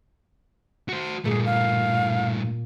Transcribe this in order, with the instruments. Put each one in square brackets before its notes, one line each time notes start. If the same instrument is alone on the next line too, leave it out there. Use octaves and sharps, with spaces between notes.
[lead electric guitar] F#4 C5
[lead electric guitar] G2 A3 [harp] A#2 [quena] G#4
[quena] F5